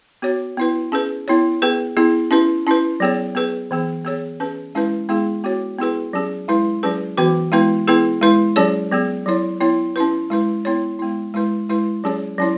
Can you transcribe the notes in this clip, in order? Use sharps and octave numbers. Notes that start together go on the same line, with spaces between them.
B3 F#4 C#5
B3 E4 B4
C#4 G#4 B4
B3 E4 C#5
B3 G#4 B4
B3 E4 G#4
C#4 E4 B4
C#4 E4 B4
F#3 B3 G#4 C#5
B3 G#4 B4
E3 B3 G#4
B3 G#4 C#5
C#4 G#4 B4
G#3 C#4 E4 B4
G#3 B3 E4 G#4
B3 F#4 C#5
B3 E4 G#4 B4
F#3 C#4 G#4
G#3 E4 B4
F#3 C#4 G#4 B4
E3 B3 F#4 B4
G#3 B3 E4 B4
B3 E4 G#4 B4
G#3 E4 B4
F#3 C#4 G#4 C#5
F#3 B3 G#4
F#3 E4 C#5
B3 E4 C#5
C#4 E4 B4
G#3 E4 B4
B3 E4 C#5
G#3 B3 E4
G#3 E4 B4
G#3 E4 B4
F#3 C#4 G#4 C#5
F#3 C#4 E4 C#5